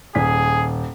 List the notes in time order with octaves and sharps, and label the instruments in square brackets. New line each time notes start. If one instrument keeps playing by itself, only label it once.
[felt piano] D#1 B6 [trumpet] G#4